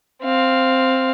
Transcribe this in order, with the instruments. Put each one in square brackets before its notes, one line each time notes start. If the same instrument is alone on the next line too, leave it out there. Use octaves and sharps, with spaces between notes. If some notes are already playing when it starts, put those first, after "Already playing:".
[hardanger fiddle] C4 F5